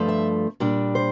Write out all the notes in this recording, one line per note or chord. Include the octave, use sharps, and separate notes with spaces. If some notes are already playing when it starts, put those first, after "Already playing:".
Already playing: G2 F3 A3
E5
A#2 G3 D4
C5